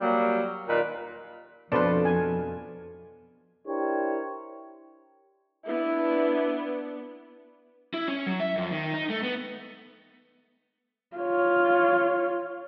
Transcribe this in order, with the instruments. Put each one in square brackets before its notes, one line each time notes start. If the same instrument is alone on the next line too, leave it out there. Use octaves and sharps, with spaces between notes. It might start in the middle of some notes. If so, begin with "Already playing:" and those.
[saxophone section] F#3 G3 A#3
D#2 A#2 A#3 B4 D5 D#5
[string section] F2 [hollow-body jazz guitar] B2 D4 [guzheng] F4 A4 [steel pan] B4 C5 D5
[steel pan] G#5
[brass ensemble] D4 E4 G4 A#4 C5 C#5
[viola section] B3 D4 [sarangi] E4
[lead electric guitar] E4
C#4
F#3
E5
F2
D#3
D#4
A3
B3
[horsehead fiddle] F4 C#5